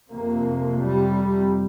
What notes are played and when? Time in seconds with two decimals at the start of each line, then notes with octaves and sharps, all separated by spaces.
0.11 F2 C3 A#3
0.79 G3